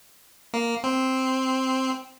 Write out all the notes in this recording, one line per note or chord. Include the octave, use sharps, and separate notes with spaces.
A#3
C4